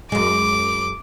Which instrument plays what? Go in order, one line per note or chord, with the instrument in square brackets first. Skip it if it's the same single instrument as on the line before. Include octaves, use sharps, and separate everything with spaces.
[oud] F#2 G#3 [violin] D6